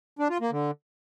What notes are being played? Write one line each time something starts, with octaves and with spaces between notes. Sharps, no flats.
D4
F4
A#3
D3